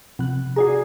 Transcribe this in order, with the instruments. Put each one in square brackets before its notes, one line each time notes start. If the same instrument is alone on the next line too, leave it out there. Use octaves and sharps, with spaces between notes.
[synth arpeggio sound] C3 F3 F#6
[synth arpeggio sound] F#4 D5 A#5 [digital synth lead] G#4